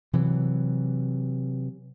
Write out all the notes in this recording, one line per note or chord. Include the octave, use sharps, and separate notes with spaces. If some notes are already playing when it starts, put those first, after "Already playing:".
C3 E3 F#3